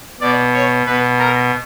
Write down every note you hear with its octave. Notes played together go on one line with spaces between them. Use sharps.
B2 D5
C#5
B2 B4
A#4